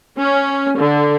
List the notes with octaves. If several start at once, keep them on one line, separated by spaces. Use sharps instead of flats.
C#4
D3